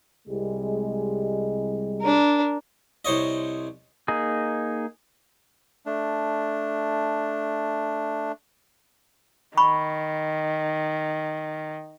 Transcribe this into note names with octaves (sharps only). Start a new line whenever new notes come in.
C2 G3 G#3
D4 A#4
C2 C5 C#5 D#5
A#3 D#4 G#4
A3 D4
D#3 B5 C#6